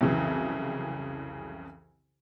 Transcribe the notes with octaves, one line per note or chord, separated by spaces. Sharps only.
C2 F2 C#3 E3 F#3